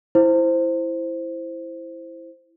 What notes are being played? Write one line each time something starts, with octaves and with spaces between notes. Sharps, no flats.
E4 C5